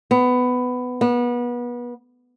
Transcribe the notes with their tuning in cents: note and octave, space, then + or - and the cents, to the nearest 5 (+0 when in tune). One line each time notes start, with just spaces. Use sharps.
B3 +15
B3 -30